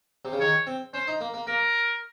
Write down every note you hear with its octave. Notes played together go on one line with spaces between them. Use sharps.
C3
C#3
D#3 C#5
C4
C#4 C5
D#4
A#3
A#3
A#3 A#4